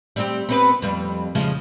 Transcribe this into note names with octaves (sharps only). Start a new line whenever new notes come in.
G3 C4 G4
B3 C4 B4
F2 G3
C#3 F3 G#3